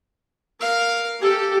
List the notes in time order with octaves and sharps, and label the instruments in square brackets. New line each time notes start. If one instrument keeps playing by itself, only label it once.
[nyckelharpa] A#4 F5
[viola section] G4 [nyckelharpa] A4